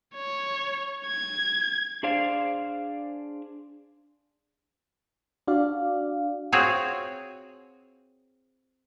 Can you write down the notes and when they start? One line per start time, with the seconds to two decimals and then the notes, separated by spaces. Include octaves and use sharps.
0.15 C#5
1.07 G#6
2.03 D4 G#4 C5 D5 F5
5.47 D4 F#4 D5 F5
6.52 C4 F4 F#4 G#4 C#5